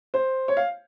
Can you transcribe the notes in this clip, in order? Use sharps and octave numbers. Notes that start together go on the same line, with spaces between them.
C5
C#5
F5